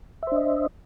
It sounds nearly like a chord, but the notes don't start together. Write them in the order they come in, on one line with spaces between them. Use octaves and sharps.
E5 C5 D4 D#5